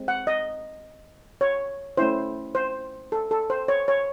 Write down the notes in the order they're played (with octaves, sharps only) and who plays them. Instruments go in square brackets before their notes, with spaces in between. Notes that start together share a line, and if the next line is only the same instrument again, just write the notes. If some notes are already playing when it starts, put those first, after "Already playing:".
Already playing: [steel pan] G#3 C4
F#5
D#5
C#5
A3 C#4 E4 C5
C5
A4
A4
C5
C#5
C#5